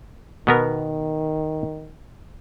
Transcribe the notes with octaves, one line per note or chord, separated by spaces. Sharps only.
B2 D#3 B3 A#4